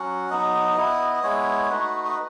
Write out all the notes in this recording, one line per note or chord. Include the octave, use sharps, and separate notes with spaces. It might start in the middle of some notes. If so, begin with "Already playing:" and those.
Already playing: F#3 C#4 F#4 F#5
F#3 B3 D#4 D#5
B3 E4
G#3 B3 E4 C#5
A3 D#4 F#4 B4
D#5